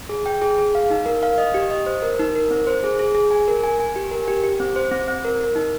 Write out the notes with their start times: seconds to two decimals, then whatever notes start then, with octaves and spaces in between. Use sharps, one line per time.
0.09 G#4
0.26 G5
0.42 G#4
0.58 G#4
0.75 F5
0.90 D#4
1.06 A#4
1.23 F5
1.38 D#5
1.54 G4
1.71 D#5
1.86 C5
2.02 A#4
2.19 D#4
2.35 A#4
2.51 C4
2.67 C5
2.84 G#4
2.99 G#4
3.15 G#4
3.31 G#5
3.48 A#4
3.64 G#5
3.80 G#5
3.96 G4
4.11 A#4
4.28 G4
4.44 G4
4.60 C4
4.76 C5
4.92 C4
5.08 C4
5.25 A#4
5.41 A#4
5.56 D#4